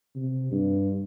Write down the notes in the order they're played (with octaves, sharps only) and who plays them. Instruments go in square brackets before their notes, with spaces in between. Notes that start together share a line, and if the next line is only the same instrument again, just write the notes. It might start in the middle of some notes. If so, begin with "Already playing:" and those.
[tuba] C3
G2